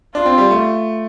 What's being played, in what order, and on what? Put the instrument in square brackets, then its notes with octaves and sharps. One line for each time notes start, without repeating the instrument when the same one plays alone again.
[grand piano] D4 [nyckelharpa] F4
[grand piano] C4
G3
A3